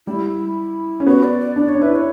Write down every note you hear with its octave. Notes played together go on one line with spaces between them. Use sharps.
G3 E4
C#4
B3 F#4
D5
D5
D4 D5
C#5
D4
E4 B4
C#5